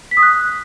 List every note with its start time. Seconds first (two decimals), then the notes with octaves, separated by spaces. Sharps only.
0.11 B6
0.17 D#6
0.23 F#6